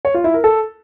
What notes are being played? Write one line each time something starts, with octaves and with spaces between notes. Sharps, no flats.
C#5
F4
E4
A#4
A4